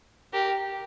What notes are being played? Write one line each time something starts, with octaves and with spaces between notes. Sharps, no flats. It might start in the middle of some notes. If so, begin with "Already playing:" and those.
G4 A#4